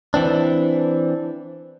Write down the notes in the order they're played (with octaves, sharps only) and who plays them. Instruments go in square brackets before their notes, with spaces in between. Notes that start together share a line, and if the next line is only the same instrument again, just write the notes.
[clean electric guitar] E3 C4 D4